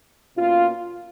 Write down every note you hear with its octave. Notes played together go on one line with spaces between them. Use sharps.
B2 A#3 C#4 F4